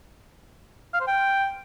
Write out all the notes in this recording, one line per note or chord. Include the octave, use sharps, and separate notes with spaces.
F5
C5
G5